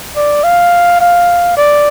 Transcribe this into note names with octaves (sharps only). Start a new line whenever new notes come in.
D5
F5
F5
D5